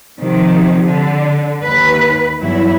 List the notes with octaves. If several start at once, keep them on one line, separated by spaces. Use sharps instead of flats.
C3 D#3 F3
D3
D#2 B4
E2 G2 F#3 E4